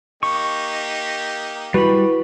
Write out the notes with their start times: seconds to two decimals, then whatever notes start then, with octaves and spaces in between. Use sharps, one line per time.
0.23 A#3 D#4 G4 C#6
1.74 G3 E4 F#4 B4 B5